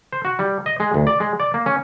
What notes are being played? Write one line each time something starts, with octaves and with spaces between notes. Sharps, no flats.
C5
F#4
G3
D#5
G#3
D2
D5
G#3
D5
A#3
C#4